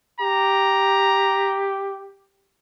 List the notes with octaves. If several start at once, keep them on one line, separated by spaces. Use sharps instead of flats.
G4 A#5